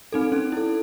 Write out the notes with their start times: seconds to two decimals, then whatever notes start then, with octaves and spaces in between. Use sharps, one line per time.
0.12 C4 D#4 A4
0.32 C#4
0.52 E4 A4